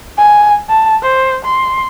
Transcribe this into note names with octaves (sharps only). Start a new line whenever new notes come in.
G#5
A5
C5
C6